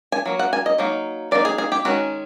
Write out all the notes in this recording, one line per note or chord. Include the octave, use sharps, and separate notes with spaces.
G#5
F#3 A#3
F#5
G#5
D#5
F#3 A#3 D#4
F#3 A#3 D#4 D5
G#4
G#4
G4
D#3 G#3 C#4 F#4